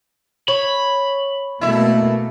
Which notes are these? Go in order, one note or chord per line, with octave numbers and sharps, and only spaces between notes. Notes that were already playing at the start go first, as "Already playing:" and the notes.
C#5 B5
B2 A3 A#3 E4 E5